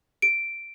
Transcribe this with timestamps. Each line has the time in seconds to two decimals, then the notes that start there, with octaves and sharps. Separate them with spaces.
0.22 D7